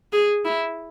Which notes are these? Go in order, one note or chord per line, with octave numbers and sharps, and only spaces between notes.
G#4
E4